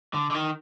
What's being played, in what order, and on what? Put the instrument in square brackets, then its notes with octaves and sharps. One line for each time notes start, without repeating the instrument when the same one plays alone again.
[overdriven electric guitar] D3
D3
D#3